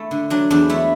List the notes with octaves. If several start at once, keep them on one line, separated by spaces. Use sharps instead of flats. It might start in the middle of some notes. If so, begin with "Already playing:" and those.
Already playing: A3 E4
D3
F#3 D4
E2 D4
A3 E4